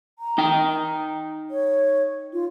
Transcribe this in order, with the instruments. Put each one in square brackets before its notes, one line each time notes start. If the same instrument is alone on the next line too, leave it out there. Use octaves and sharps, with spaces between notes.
[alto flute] A#5
[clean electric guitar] D#4 G5
[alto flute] C#5
F4